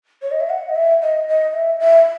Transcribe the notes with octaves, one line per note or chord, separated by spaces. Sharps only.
C#5
D#5
E5
F#5
D#5
E5
D#5
D#5
E5
E5